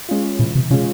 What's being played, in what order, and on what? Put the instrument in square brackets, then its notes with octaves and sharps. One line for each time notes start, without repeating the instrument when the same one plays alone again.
[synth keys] G#3 C#4 F4
[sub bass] A#2 [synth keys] E3
[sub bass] C3
[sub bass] C3 [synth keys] G#3 C#4 F4